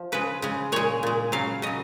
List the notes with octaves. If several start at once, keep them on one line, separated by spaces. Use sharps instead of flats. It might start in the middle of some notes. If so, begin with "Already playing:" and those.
Already playing: F3
C#3 G#3 B4
C#3 G#3
A#2 G#3 C#5
A#2 G#3
C#3 F#3 F5
C#3 F#3 D#5